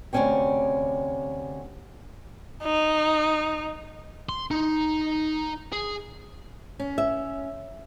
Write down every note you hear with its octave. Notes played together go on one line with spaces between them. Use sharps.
D2 C3 A3 C#4 C#5 G5
D#4
C6
D#4
G#4
C#4
E5